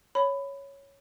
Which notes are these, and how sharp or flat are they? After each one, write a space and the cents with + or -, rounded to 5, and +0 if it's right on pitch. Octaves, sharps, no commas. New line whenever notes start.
C#5 +0 B5 +15